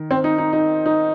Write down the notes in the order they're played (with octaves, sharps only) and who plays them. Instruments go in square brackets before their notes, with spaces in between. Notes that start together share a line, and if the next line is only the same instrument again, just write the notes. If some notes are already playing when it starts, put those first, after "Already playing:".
Already playing: [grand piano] D#3
[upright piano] C4
D#4
D#4
D#4
D#4